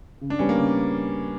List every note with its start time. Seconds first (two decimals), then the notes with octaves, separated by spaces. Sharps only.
0.21 C#3
0.30 D4
0.39 G3 B3 C#4
0.49 A#3
0.57 C#3